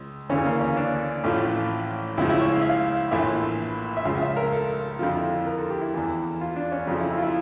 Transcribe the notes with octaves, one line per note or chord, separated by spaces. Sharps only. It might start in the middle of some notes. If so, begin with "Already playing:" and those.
Already playing: C#2
D2 C#3 E3 C#4
A#3
C#4
D4
A1 A2 F3
C#2 C#3 F3 E4
E4
C#5
F5
E5
F5
A#1 A2 E3 E5
E5
C#2 C#3 F3 F5
E5
A#4
A4
F2 D3 F3 F4
E4
A#4
A4
G4
E4
E2 E3
F4
D4
C#4
F2 C#3 F3
E4
E4
F4
E4